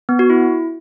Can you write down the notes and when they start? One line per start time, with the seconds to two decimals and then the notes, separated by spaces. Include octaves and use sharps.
0.09 B3
0.19 F#4
0.30 E4